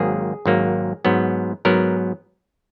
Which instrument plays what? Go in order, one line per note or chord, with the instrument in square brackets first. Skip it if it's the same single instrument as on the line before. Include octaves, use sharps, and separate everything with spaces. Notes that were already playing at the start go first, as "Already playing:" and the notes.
Already playing: [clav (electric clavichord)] G#1 G#2 F#3 A#3 G#4
G#1 G#2 F#3 A#3
G#2 F#3 B3
G#2 F#3 B3 A#4